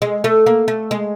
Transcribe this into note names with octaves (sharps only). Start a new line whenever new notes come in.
G#3
A3
A#3
A3
G#3